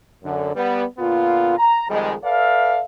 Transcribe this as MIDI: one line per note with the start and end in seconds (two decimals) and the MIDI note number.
0.23 0.54 42
0.23 0.54 50
0.55 0.84 55
0.55 0.84 59
0.98 1.57 46
0.98 1.57 50
0.98 1.57 59
0.98 1.57 65
1.58 1.86 82
1.89 2.14 41
1.89 2.14 51
1.89 2.14 55
1.89 2.14 56
2.23 2.82 69
2.23 2.82 71
2.23 2.82 74
2.23 2.82 76
2.23 2.82 77